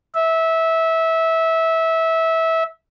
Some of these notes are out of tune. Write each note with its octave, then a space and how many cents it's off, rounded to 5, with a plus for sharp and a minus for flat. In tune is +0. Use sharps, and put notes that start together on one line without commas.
E5 -20